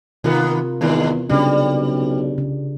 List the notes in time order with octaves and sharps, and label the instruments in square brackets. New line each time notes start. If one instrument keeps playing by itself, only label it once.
[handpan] C3 F4 A#4 [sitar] D#3 A#3 B3
[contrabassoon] E2 [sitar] A2 D#3 G#3
[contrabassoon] B1 [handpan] C#3 D4 [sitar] G3
[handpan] C#3